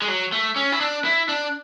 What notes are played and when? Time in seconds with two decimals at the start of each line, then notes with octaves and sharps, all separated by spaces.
0.02 G#3
0.08 F#3
0.32 A3
0.56 C#4
0.72 E4
0.81 D4
1.05 E4
1.29 D4